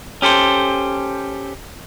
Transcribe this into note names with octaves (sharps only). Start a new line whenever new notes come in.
C#4 G4 A4 C5